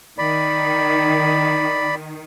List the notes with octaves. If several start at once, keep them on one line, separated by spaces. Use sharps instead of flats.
D#3 D5 B5